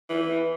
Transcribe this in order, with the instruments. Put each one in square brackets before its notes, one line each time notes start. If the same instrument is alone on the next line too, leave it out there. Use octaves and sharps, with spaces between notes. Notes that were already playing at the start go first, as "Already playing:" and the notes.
[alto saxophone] E3